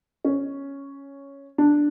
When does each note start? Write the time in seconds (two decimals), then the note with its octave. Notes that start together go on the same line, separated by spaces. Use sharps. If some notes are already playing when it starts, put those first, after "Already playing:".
0.25 C#4
1.58 D4